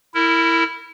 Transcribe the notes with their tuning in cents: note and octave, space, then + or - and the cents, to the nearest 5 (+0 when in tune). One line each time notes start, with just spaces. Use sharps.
E4 +0 A#4 -25